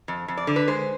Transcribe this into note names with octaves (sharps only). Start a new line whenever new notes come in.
F2
F2
D5
D3
B4
G#3 C5